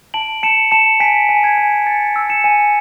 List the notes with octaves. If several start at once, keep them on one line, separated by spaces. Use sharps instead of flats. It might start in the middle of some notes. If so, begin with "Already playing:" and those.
A5 D7 F#7
A5 C#7 E7
A5 C#7 E7
G#5 B6 D7
G#5
G#6 B6
G#5
G#5 A6 C#7
E6
C#7 E7
G#5